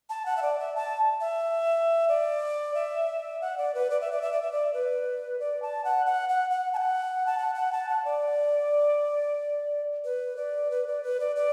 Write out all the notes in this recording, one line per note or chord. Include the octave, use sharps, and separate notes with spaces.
A5
F#5
E5
D5
E5
A5
E5
D5
E5
F#5
D5
B4
D5
E5
D5
E5
D5
E5
D5
B4
D5
A5
F#5
F#5
F#5
F#5
A5
F#5
A5
F#5
F#5
A5
F#5
D5
B4
D5
B4
D5
B4
D5
D5